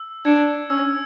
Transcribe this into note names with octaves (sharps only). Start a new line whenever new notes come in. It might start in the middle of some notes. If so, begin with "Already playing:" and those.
Already playing: E6
D4 G#6 C#7
C#4 E6